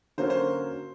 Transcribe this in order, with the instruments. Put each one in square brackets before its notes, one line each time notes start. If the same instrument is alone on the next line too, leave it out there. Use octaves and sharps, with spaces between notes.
[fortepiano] D3 F#3 A#3 C#4 F#4 [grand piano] C5
[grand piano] C5